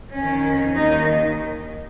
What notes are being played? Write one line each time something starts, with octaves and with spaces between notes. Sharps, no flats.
F2 D#3 C#4
D#2 D#3 D#4